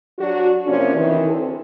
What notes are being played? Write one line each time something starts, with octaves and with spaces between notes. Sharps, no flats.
F#3 D4 F#4
C3 F3 A#3 C#4 D4
C3 D#3 E3
D2 C4 A4